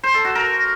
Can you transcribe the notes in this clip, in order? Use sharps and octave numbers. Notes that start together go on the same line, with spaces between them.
C5
A4
F#4
A#4